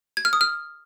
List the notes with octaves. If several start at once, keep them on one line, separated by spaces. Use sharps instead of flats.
G#6
F6
D#6
F6